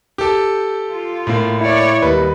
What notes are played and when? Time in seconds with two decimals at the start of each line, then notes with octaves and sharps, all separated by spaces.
0.18 G4 A4
0.91 F4
1.27 A2 A#3
1.61 E4 C#5 D5
2.02 D#2 G3 B4